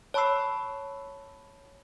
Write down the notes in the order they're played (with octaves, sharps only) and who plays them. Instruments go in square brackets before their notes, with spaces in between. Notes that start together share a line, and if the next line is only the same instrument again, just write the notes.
[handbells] C#5 A5 B5 C#6 E6 C7